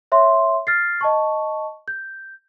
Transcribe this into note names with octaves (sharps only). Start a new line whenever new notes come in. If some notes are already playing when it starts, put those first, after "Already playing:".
C#5 E5 C6
F6 A6 C7
D#5 A5 C#6
G6